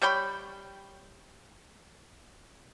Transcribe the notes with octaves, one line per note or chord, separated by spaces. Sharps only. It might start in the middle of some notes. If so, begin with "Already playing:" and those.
G3 C#5 G5 B5